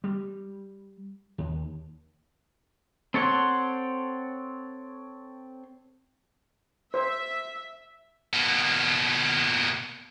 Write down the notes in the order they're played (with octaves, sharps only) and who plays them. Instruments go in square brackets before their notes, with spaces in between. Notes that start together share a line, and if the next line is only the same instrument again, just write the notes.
[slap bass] G3
D#2
[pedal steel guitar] C4 A4 C#5 F#5 C6
[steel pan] C5 [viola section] E5
[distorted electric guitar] B2 A#3